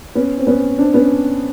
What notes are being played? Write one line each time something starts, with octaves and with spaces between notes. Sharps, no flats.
B3 C#4
C4
B3 C#4
C4 D4
B3 C#4